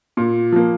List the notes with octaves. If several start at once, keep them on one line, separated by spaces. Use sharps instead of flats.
A#2
F3 A#3